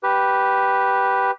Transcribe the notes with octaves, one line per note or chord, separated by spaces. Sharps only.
G4 B4